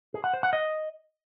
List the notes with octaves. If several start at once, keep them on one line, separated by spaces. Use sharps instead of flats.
G#4
F#5
C5
F#5
D#5